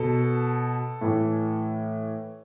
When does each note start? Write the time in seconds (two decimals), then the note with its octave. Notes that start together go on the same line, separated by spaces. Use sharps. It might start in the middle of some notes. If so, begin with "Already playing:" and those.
Already playing: B2 A4
1.01 A2 E3